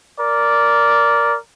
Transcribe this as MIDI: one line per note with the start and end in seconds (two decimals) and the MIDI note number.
0.20 1.37 70
0.20 1.37 74